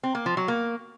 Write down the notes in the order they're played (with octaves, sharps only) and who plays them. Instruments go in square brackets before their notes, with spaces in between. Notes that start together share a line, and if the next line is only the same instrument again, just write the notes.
[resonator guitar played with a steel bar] C4
A#3
F3
F#3
A#3